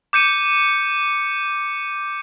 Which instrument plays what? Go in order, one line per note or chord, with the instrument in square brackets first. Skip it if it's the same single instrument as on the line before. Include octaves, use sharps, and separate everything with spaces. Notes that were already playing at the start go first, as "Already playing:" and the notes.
[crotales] D6 G6 C#7 D#7